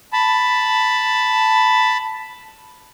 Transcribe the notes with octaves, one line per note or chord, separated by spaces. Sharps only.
A5 B5